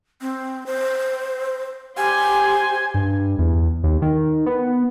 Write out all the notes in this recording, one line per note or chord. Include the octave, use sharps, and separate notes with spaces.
C4
C5
G4 C5 G#5
G2
E2
D#2
D#3
B3